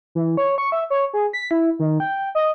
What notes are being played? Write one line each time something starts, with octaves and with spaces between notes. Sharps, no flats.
E3
C#5
C#6
E5
C#5
G#4
B6
E4
D#3
G5
D#5